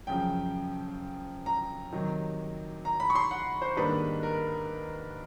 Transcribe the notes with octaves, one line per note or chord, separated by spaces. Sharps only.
F#2 C#3 F3 G5
A#5
C3 D#3 F#3
A#5
B5
C#6
C6
F#5
C5
G#2 D#3 G3 A#3 D4 B4
A#4